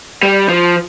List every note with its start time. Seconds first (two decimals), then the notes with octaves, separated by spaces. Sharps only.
0.23 G3
0.49 F3